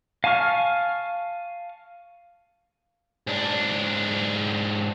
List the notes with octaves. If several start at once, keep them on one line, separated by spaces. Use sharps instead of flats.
F5 G#5 A5 C#6 F6
G#2 D4